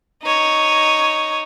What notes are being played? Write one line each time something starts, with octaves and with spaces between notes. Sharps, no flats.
D#4 C#5